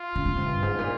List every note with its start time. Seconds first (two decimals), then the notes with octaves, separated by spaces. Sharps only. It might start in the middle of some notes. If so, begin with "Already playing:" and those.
Already playing: F4
0.15 C#3
0.26 C#3
0.36 C3
0.47 G2
0.63 G#2
0.79 A#2